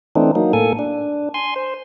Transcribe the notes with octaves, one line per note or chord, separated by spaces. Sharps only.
E3 A3 C4 D4 D#4
F#3 A#3 D#4
A2 A#3 A4 G#5
D4
G#5 C6
C5